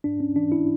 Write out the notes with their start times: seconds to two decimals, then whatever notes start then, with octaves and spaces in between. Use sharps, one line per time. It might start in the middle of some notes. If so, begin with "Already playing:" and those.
0.04 G#2 D4
0.20 C#4
0.36 E3 D4
0.52 E4